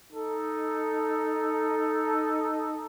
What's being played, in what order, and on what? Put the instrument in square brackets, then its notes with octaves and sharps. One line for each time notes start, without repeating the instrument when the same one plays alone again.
[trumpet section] D#4 A4